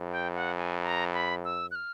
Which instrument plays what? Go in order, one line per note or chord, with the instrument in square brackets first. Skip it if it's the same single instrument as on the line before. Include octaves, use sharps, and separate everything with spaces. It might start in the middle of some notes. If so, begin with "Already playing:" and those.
Already playing: [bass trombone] F2
[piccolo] G5
F#5
G#5
A#5
B5
E6
F#6
F6